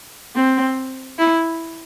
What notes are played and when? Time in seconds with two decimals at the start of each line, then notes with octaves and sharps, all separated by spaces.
0.36 C4
1.18 E4